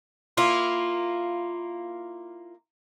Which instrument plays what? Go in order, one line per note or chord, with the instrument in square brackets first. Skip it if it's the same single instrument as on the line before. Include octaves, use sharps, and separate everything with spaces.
[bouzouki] A#3 E4 F4